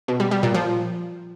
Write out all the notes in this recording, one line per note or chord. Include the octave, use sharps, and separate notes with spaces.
B2
G3
G3
A#2
F3